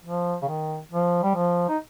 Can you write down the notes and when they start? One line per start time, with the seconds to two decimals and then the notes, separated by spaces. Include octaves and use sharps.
0.05 F3
0.42 C#3
0.48 D#3
0.91 F3
1.23 G3
1.35 F3
1.68 D#4